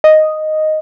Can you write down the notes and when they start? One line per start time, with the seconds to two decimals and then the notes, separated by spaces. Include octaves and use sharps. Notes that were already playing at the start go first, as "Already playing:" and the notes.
0.04 D#5